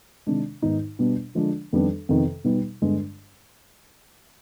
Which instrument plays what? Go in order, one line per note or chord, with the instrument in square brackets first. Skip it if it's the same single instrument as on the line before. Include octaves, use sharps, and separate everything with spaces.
[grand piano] C3 D#3 G#3 D4
G#2 D#3 B3 D#4
B2 G3 B3 D4
D3 F3 G#3 D4
F2 D#3 G3 B3 D4
F2 C3 D#3 B3
B2 G3 B3 D#4
G2 D3 G#3 B3 D4